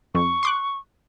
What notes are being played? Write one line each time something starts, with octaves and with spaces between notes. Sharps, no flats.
F2 C#6
C6 D6 F#6